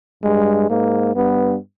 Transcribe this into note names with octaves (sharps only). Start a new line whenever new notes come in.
G2 G#3
G#2 A#3
G2 B3